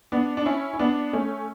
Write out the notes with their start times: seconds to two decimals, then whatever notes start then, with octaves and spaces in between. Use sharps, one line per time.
0.12 B3 D4
0.37 D4
0.46 C#4 E4
0.73 E4
0.79 B3 D4
1.13 A3 C#4